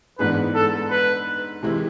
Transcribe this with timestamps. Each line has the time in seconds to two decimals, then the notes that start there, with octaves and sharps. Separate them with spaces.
0.19 G#2 E3 B3 D4 G#4 B4
0.55 A4
0.91 B4
1.63 C3 E3 G#3 C4 E4